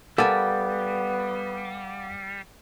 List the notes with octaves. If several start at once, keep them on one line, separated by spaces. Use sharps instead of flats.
G3 B3 A4 A#4 F5 F#5 G#5 D6